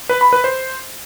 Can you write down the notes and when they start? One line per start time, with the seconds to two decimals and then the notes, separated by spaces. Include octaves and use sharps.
0.09 B4
0.21 B5
0.33 B4
0.44 C5